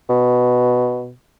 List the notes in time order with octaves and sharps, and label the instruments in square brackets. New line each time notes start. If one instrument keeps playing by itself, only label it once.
[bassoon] B2